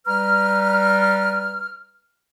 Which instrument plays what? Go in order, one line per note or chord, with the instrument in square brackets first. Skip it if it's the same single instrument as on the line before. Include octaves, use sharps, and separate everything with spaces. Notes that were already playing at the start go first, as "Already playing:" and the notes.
[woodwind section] G3 B4 A#5 F6